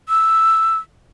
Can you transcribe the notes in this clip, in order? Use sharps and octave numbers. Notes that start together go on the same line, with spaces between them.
E6